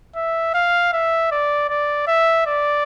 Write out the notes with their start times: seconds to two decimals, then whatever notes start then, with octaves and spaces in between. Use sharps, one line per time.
0.16 E5
0.54 F5
0.93 E5
1.32 D5
1.70 D5
2.08 E5
2.47 D5